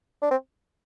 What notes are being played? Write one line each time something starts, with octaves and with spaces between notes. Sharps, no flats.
D4
C4